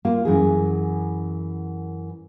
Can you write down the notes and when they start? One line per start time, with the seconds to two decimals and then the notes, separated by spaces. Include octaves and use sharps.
0.05 A#3 F4
0.25 F#2 E3 G#4